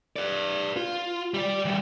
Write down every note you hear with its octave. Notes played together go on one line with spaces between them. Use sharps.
B4 D5
F4
G3 D5
E3 G3